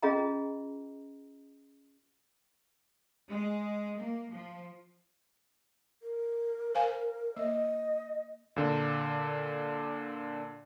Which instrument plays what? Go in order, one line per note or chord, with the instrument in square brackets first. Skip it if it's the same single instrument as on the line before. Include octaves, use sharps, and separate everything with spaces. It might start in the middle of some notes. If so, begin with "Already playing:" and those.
[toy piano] C#4 F4 G#4 D#5 G5 A#5
[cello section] G#3
A#3
F3
[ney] A#4
[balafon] C5 F5 G#5
[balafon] A#3 [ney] D#5
[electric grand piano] A#2 D3